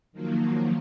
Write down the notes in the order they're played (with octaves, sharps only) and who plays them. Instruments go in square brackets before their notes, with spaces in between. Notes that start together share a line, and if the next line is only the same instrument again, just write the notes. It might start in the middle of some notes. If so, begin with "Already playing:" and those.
[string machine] D#3 F3 F#3 A#3